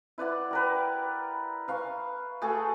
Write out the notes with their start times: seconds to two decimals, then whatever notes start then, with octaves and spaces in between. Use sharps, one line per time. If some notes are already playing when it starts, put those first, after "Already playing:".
0.18 E4 B4 D5 F#5
0.51 G4 A#4 B4
1.68 B4 F5 C#6
2.42 A3 F#4 G#4 A4